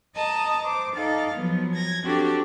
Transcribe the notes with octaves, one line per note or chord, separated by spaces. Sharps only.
D#5 A5 A#5 D#6
C5 D6
D#4 A4 D5 F5
F3 F#3 B3
G#6 A#6
C4 D4 F#4 G4 A4